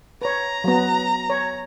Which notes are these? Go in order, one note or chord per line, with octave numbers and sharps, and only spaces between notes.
B4 C#5 A#5
F#3 B3
C#5